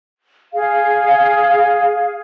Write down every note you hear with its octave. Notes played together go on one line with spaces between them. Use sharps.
G#4 F5